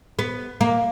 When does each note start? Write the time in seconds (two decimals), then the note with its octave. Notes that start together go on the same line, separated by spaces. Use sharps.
0.19 B3
0.61 A#3